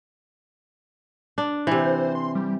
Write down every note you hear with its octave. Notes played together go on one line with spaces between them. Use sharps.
D4
C3 E3 C5
C6
G3